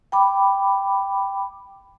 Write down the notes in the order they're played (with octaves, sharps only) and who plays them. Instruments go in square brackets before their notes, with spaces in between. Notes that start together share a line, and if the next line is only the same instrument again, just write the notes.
[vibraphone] G5 B5 D6